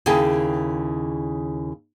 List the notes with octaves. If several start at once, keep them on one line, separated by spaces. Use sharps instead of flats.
D#2 C#3 E4 G#4 G5 A5